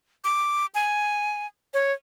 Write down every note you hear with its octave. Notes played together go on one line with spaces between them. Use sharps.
D6
G#5
C#5